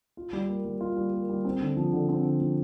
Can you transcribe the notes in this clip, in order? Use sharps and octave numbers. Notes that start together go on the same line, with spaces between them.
F4
G3
A#3
G3
F4
G3
A#3
G3
C4
D3
F3
D3
C4
D3
F3